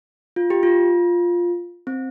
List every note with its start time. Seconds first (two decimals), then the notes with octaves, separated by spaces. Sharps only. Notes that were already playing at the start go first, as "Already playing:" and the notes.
0.36 F4
0.50 G4
0.63 F4
1.87 C4